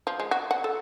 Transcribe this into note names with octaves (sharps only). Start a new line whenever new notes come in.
F3
G#3
F#4
F#5
A4